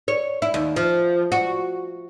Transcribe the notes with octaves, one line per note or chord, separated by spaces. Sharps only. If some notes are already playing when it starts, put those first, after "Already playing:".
C#5
E4
D#2
F3
F#4